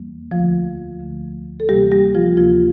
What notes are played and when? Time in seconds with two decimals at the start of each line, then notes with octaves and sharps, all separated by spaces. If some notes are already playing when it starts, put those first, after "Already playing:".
Already playing: E2 E3 G3 A#3
0.31 D2 D3 F3 A3 F4
1.00 D2 D3 A3
1.60 A4
1.68 D2 C3 E3 G3 A#3 G4
1.92 G3 G4
2.15 F3 F4
2.37 D2 C3 E3 F3 A#3 F4